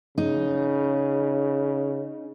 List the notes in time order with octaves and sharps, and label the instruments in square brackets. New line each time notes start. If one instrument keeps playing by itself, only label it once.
[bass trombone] C#3 [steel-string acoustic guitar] D#4